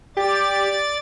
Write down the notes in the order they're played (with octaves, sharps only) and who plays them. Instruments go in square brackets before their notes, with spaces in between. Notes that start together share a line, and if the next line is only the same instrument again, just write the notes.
[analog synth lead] G4 [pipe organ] D5 A6